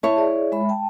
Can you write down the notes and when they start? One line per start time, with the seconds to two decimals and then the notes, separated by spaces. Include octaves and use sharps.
0.03 E4 C#5 E5 A5
0.16 G#4 D5
0.52 G#3 E5 B5
0.69 G5 A5